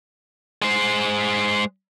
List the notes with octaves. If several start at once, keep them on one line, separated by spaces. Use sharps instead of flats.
G#3 C5